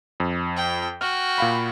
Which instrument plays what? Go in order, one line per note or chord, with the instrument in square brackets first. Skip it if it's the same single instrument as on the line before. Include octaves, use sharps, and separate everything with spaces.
[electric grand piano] F2
[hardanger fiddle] G5
[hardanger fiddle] F#4 G5 [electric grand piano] F6
[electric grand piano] A#2 F5 B5